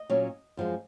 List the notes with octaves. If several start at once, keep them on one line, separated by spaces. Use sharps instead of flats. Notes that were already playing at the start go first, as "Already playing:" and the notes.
Already playing: D#5
A#2 F#3 C#4
F#2 F3 G#3